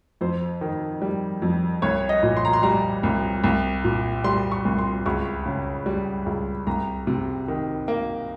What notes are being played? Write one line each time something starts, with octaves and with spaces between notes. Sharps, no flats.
F2 C5
D#3
G3
F2
C2 C#5
D#5
A#2
C6
A#5
C6
G3 A#5
C2
C2
A#2
G3 C6
C#6
C2
C6
C#2 C#6
C#3
G3
C#2
C2 A#5
C3
D#3
A#3